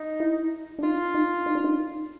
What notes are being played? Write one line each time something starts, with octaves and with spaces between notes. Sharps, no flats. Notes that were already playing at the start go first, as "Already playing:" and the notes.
Already playing: D#4
E4
D4
D#4 F4
D#4
D#4
D4
D#4